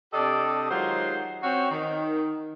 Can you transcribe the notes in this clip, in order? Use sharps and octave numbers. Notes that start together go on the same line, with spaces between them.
C3 D4 G4 A4 D5 D#5
D#3 F#3 G#3 F4 G4 C5
C4 C#4 F#4
D#3